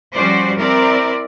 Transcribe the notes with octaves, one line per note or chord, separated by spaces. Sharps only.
F3 G3 C#4 F#4 C5 D5
C4 E4 A#4 D5